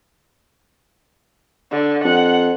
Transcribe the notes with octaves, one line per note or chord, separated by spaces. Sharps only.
D3
F2 F#5